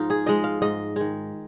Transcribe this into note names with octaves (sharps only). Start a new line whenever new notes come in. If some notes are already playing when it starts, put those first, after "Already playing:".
Already playing: G#2 F3 G#3 D#4 F4
G#4
F3 G#3 D#5
F5
G#2 D#5
D#3 G#3